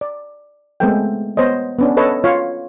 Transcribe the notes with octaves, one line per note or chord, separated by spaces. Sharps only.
D5
G#3 A3 B3 C4 A4 G5
B3 C5 C#5 D#5
B3 C#4 D4
A4 B4 C#5 D#5 A5
F4 C#5 F5